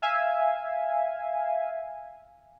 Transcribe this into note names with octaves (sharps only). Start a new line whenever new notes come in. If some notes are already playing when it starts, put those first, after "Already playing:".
E5 F5 G#5